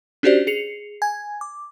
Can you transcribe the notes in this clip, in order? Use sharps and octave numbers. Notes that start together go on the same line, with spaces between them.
C#4 D4 F#4 G4 C5 D5
G#4 C7 C#7 F7
G#5 G#6
D6